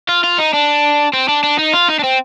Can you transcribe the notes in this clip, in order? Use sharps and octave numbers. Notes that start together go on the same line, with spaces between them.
F4
F4
D#4
D4
C4
D4
D4
D#4
F4
D#4
D4
C4